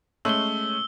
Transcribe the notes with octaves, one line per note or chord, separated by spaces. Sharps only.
G#3 A3 C#4 E6 G7